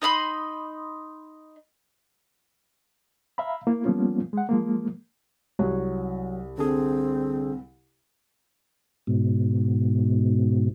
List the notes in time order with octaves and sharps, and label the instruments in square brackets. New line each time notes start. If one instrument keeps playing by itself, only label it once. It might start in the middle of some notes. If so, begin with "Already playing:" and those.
[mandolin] D#4 D#5 B5 C6
[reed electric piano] E5 F5 A#5 B5
A#3 E4
F3 G3 A#3 B3 C#4 F4
G#3 F#5
F3 G#3 A#3
[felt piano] C2 [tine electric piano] F#3
[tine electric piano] D3 D4 G#4 [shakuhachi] C4
[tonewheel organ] G#2 B2